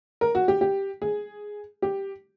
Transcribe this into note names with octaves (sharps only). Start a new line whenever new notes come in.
A#4
F#4
G4
G4
G#4
G4